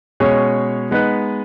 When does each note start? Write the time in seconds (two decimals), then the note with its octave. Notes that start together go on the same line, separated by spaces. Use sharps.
0.20 B2 G#3 C#4 G#4 C#5
0.91 G#3 B3 D#4 B4